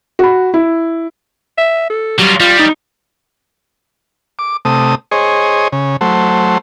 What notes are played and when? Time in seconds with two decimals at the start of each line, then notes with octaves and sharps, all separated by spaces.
0.19 F#4 B5
0.54 E4
1.58 E5
1.90 A4
2.19 F#3 G3 F4
2.40 G3 F4
2.59 D#4
4.39 D6
4.65 C3 A3 D#6
5.11 G#4 C5 C#5 D#5
5.72 C#3
6.01 F#3 A3 C5